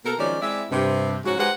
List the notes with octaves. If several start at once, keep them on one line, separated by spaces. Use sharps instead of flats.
B2 A#3 A4 A#4
D#3 F3 F#3 G#3 C#4 D5
G#3 C4 E4 D5 E5
G2 C3
G#2 F3 C#4 F#4
G#3 D#4 G4 B4 C5 F#5